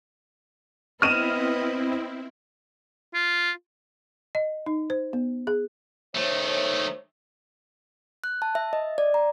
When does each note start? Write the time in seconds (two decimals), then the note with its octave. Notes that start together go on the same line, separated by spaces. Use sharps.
1.02 B3 C4 E4 B4 D#5 F6 D#7 E7
3.14 F4
4.35 D#5
4.66 D#4
4.90 C5
5.13 B3
5.47 G#4
6.15 D#3 A3 C5 C#5
8.24 F#6
8.42 A5
8.55 E5
8.73 D#5
8.98 D5
9.14 A#5